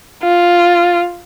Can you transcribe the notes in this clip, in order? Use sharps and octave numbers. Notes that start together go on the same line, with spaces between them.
F4